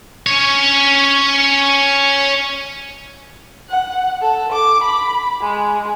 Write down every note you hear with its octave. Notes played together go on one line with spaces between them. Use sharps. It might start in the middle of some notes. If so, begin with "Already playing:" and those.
C#4 C#5
F#5
A4
D6
B5
G#3